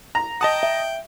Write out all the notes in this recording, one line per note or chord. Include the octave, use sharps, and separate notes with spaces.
A#5
D#5 G5 A5 D#6
E5